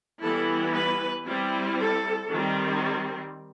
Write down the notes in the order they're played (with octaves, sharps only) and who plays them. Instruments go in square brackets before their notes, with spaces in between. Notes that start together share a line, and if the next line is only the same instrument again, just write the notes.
[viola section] E3 G3 B3 E4 A4
B4
G3 C4 E4
A4
D#3 G3 C4